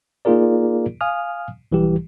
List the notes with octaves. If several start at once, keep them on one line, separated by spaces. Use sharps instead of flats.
A#3 D#4 F4 G#4 A#4 D5
F5 G#5 D#6 F6
B1 E3 G3 G4